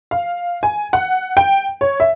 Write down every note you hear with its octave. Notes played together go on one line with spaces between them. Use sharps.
F5
G#5
F#5
G5
C#5
E5